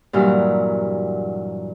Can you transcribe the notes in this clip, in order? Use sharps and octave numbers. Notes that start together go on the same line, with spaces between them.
G2 A#2 E3 F#3